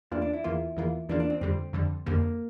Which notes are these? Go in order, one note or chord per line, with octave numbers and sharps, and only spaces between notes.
E2 E3 A#3 D4 F4
D4
E4
E2 E3 A#3 F4
E2 E3 A#3 F4
E2 E3 A#3 D4 F4
D4
C4
F2 D3 G3 C4
F2 D3 G3
F2 D3 G3 A#3